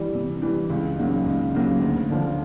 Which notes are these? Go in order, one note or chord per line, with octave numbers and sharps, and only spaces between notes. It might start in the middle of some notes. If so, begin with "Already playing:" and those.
Already playing: E3 G3
C3
E3 G3
C#2
C#3 F#3 A#3 D#4
C#2
C#3 F#3 A#3 D#4
D2
D3 F3